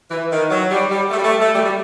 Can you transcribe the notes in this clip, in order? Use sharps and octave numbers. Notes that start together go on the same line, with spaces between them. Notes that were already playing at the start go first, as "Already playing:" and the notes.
E3
D#3
F#3
G3
G3
A3
G3
A3
A3
G3
G3